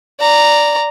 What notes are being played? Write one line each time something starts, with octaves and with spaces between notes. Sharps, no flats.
D5 A#5